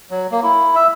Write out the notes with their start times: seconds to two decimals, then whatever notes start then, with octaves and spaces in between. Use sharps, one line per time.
0.11 F#3
0.31 A#3
0.43 E4
0.75 E5